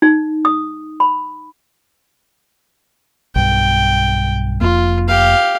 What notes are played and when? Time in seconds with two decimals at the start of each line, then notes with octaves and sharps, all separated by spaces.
0.02 D#4
0.45 D#6
1.00 B5
3.36 B1 G2 G5
4.61 F1 F2 A#3 F4
5.08 G4 F5